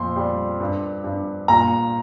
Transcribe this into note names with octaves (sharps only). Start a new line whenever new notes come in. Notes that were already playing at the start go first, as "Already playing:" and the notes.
Already playing: F2 A#2 C6
G3
G2
G2
A#2 A#5